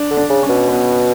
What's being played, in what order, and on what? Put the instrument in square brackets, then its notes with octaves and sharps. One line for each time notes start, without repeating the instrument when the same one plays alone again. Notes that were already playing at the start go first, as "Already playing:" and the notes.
Already playing: [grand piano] D4
[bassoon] D3
[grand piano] D4
[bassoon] C#3
[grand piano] C#4
[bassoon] B2
[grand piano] B3